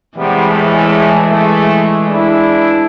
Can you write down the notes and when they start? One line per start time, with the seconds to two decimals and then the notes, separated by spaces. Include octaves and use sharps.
0.17 C3 E3 G3 G#3 B3
0.49 E2 A2 A3
1.30 A3
2.07 D4 E4